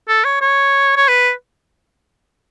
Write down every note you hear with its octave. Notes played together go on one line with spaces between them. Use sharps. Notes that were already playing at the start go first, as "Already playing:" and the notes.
A4
C#5
C#5
C#5
B4